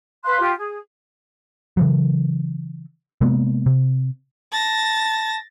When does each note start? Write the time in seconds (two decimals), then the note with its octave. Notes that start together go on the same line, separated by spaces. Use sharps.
0.24 B4 F5 C6 F#6
0.40 F4 G4
0.57 G#4
1.77 C#3 E3 F#3
3.21 C3 G#3 A#3 B3
3.66 C3
4.52 A5 A6 A#6